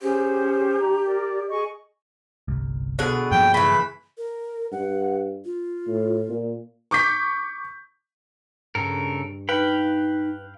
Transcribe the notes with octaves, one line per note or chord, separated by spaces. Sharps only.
C#4 G4 G#4 C5
D4 A#5
A#4 D5
G#4 D#5 C#6
G1 C2
B2 D3 G#4
G2 F3 A#3 G5
C#3 E3 B5
A#4
G2 F#5
F4
A2
A#2
C#6 D6 G6 B6
G2 C#3 A4 A#4
D#4 B4 F5 G5 B5 F#6